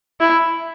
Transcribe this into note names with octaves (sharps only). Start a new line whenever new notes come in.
E4